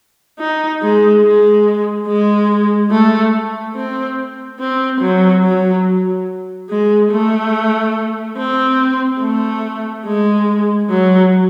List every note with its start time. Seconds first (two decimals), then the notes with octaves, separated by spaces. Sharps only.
0.39 D#4
0.82 G#3
1.23 G#3
2.07 G#3
2.91 A3
3.75 C4
4.60 C4
5.01 F#3
5.44 F#3
6.70 G#3
7.12 A3
8.38 C4
9.21 A3
10.06 G#3
10.89 F#3